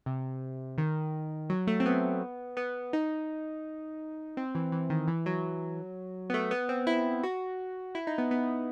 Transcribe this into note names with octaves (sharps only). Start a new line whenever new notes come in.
C3
D#3
F#3
A3
C4
B3
B3
D#4
C4
E3
E3
D#3
E3
F#3
B3
A3
B3
C4
E4
F#4
E4
D#4
B3
B3